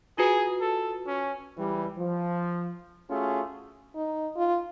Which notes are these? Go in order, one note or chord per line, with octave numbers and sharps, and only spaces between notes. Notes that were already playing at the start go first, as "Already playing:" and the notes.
F4 F#4 G#4 B4
A4
C#4
C#2 E3 G3
F3
A3 C#4 F4 F#4 G#4
D#4
F4